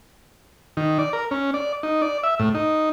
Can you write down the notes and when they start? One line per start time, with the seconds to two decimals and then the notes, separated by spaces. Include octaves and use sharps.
0.77 D#3
0.99 D5
1.13 A#4
1.31 C#4
1.54 D5
1.83 D#4
2.02 D5
2.24 E5
2.39 A2
2.54 D#4